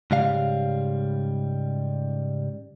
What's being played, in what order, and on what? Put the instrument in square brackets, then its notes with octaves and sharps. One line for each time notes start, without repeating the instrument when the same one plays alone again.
[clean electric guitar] G#2 C#3 G3 F5